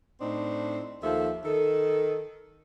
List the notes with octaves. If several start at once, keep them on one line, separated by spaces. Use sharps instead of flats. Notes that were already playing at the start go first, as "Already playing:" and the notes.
A2 C4 D4 D#4
D#2 F3 A4 E5
D#3 A4